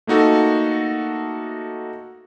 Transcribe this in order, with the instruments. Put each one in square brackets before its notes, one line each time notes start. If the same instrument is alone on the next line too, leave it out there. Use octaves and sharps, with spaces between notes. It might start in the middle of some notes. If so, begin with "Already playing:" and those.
[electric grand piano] A3 A#3 D#4 F#4 A4